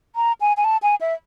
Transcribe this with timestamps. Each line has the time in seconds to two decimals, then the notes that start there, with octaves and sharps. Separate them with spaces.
0.16 A#5
0.41 G#5
0.57 G#5
0.64 A5
0.83 G#5
1.01 E5